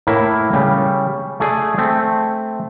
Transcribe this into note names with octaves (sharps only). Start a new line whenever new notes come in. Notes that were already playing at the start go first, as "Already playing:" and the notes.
A2 A#3 E4
C#3 G3
A3 G#4 D5
A3 C4